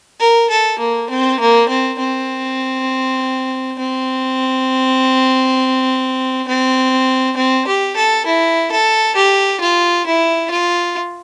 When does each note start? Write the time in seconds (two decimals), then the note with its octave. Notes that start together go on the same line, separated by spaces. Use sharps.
0.20 A#4
0.50 A4
0.79 A#3
1.10 C4
1.40 A#3
1.69 C4
1.99 C4
3.79 C4
6.48 C4
7.37 C4
7.67 G4
7.97 A4
8.26 E4
8.71 A4
9.16 G4
9.61 F4
10.06 E4
10.51 F4